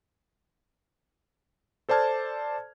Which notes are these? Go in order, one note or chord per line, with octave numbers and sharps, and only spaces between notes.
A4 C5 D5 A5 F6 G#6